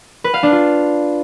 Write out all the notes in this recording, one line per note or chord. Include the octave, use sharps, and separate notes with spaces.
B4
F5
D4
F4